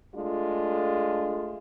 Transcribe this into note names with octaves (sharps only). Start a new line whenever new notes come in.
G#3 A3 D4 F4